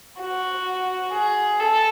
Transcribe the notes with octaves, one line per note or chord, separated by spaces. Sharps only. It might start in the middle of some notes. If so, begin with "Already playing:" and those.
F#4
G#4
A4